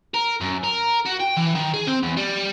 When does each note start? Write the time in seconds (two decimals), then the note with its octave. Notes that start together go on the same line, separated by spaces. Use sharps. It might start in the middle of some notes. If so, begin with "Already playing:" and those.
0.14 A#4
0.41 F#2
0.64 A#4
1.05 F#4
1.20 G5
1.37 E3
1.55 D#3
1.74 G#4
1.87 C4
2.03 E2
2.17 G3